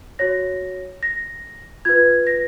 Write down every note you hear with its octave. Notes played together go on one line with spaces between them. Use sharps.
F#4 C#5 A#6
A#6
F4 B4 G#6
A#6